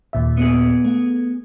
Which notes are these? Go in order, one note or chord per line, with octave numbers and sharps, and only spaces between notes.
D#2 A#2 E5
B3 G#4
A3